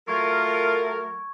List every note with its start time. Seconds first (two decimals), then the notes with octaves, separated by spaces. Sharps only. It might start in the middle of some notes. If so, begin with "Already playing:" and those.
0.08 F#3 A3 F4 A#4 C#6 G#6